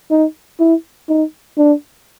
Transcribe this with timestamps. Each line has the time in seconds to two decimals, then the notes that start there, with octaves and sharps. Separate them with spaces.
0.11 D#4
0.60 E4
1.09 D#4
1.58 D4